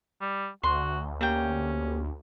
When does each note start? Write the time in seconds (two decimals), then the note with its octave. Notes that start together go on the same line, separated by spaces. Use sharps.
0.21 G3
0.63 D2 F#4 C6
1.21 A#3 C#4 G4 G5 A#5